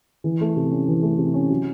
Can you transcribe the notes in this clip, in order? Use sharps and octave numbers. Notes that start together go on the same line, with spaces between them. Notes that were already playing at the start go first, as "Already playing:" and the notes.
E3
A3
C3
C#4
E3
A3
C3
C#4
F#3